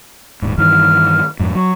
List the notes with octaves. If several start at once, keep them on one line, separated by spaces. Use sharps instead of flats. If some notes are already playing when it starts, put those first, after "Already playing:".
D#1 G#2
G2 D#3 E3 F6
F2 G#2
F#3 C#6